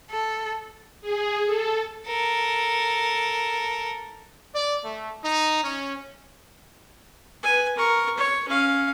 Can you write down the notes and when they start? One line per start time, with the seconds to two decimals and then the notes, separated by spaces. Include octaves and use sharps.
0.11 A4
1.01 G#4
1.46 A4
2.07 A4 A#4
4.55 D5
4.84 A3
5.23 D#4
5.64 C#4
7.43 B4 G#5
7.75 A#4 C#6
8.17 C#5
8.48 C#4 F5